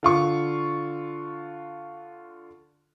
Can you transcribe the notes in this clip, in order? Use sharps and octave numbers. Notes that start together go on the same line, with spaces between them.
D3 F4 C#6